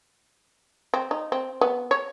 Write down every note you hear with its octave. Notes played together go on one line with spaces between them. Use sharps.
C4
D#4
C4
B3
C#5